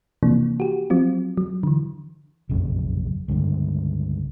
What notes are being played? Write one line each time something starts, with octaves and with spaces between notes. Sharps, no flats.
C3 E3 F3 A#3 D4
F#4 G4
F3 F#3 C4 F4
F#3
D3 E3
F1 A#1 F#2 C#3
C#2 G2 D3